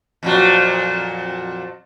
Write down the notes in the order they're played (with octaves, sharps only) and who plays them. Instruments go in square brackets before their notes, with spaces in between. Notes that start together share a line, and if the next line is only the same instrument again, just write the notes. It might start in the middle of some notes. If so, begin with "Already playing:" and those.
[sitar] F2 A#2 F#3